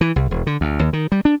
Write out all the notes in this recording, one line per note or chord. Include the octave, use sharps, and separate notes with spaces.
E3
C2
E1
D3
D2
D#2
D#3
G3
D4